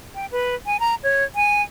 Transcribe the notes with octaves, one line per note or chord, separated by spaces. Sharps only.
G5
B4
G#5
A#5
C#5
G#5